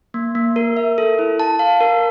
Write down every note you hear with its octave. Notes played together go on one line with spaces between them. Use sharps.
A#3
A#3
A#4
E5
A4
E4
A5
F5
A#4